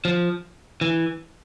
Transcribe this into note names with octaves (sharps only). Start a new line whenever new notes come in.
F3
E3